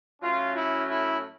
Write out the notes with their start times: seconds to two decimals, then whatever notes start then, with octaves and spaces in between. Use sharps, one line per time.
0.22 A2 F#3 A3 C#4 F4
0.55 E4
0.88 E4